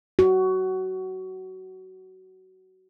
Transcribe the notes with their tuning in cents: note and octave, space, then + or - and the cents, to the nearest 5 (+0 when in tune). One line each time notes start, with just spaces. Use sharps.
F#4 +20